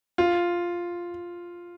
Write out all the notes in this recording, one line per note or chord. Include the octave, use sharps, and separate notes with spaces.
F4